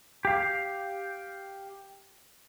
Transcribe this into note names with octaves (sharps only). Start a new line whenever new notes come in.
G4 F5